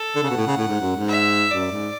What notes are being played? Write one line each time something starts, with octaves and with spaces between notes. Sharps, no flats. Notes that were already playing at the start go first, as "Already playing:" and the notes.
Already playing: A4
D3
C#3
B2 F#5
A2
C#3
A2
G#2
F#2
G#2
E5
F#2 D5
G#2